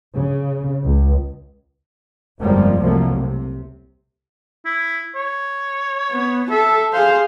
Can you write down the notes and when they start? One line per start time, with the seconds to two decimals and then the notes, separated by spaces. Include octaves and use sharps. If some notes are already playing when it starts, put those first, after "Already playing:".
0.15 C#3
0.84 C#2
2.40 G1 F2 F3 G3 G#3 A#3
2.81 C2 F3 F#3 A3 A#3
3.12 C3
4.66 E4
5.15 C#5
6.11 B3
6.51 A4 E5
6.93 G#4 C5 F5